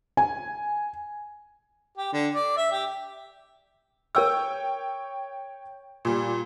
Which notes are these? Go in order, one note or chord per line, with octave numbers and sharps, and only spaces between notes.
G#5
G4
D3
D5
E5
G4
A#4 C#5 G5 E6
A#2 G3